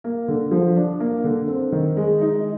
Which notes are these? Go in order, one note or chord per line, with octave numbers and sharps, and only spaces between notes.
A#3
D3
F3
D4
A#3
D3
C4
D#3
G#3
D#4